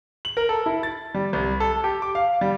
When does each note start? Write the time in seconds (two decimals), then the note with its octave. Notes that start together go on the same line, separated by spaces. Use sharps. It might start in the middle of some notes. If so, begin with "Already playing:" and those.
0.25 F#7
0.37 A#4
0.49 A4
0.66 E4
0.83 A6
1.15 G3
1.33 C2
1.60 A4
1.84 G4
2.02 D6
2.15 F5
2.41 G3